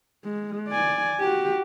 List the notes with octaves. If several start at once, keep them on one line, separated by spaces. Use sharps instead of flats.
G#3
D5 G#5
F#4 G4